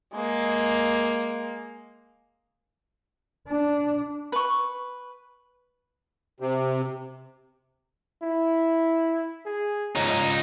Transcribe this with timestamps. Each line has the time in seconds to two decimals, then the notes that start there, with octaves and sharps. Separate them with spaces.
0.14 G#3 A#3
3.48 D4
4.32 B4 C#6
6.40 C3
8.23 E4
9.46 G#4
9.95 C#2 D#4 C#5